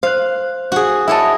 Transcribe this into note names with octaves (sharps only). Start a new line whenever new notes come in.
C5 F5 F#6
F#4 G#4
E4 C#5 D#5 E5 A5